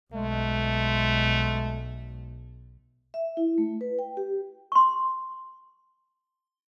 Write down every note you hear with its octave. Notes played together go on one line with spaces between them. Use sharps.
B1 G#3 A3
E5
E4
A3
B4
G5
G4
C6 C#6